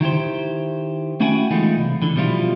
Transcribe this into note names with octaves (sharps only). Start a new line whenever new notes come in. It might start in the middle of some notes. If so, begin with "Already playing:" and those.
D#3 E4 G4 C5
A3 C#4 E4 F#4 G5 G#5
E3 G#3 A3 B3 D#4 F4
C2
D3 E3
B2 F3 G3 E4 F4